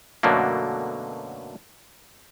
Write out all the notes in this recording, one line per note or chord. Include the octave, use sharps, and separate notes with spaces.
F#2 B2 D3 F#3 A3 A#3